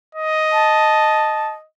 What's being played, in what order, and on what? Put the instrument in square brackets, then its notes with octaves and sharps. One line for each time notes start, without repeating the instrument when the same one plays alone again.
[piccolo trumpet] D#5
[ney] A5